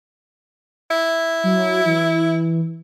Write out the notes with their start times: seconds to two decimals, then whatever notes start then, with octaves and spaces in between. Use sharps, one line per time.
0.90 E4
1.44 F#3
1.86 E3